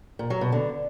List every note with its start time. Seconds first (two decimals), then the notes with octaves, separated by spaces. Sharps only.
0.19 A#2
0.30 F#3
0.41 B2
0.52 D3